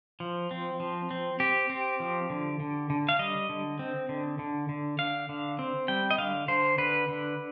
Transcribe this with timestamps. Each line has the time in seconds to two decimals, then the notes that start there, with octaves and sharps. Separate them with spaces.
0.20 F3
0.51 C4
0.80 F3
1.11 C4
1.40 C4 G4
1.70 C4
2.00 F3
2.30 D3
2.60 D3
2.90 D3
3.09 F5
3.19 G3 D#5
3.49 D3
3.79 C4
4.09 D3
4.39 D3
4.69 D3
4.99 D3 F5
5.29 D3
5.59 C4
5.88 G3 G5
6.11 D#5
6.18 D3 F5
6.48 D3 C5
6.78 D3 B4
7.08 D3